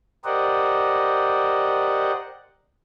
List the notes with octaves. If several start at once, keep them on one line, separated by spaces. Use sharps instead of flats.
G4 A#4 C5 D5 D#5 F#5